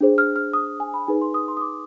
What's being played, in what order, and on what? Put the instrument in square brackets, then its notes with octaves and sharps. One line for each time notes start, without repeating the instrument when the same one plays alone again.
[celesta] D4 G#4 C5
F6
F6
D#6
G#5
B5
D#4 G#4 B4 G#5
C6
D#6
C6
D#6
D6